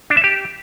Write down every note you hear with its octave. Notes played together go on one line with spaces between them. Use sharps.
D4
E5
G4